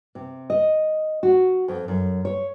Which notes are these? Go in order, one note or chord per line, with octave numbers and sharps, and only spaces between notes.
C3
D#5
F#4
F2
F#2
C#5